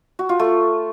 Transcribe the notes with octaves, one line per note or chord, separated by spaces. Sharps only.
F#4
F4
A3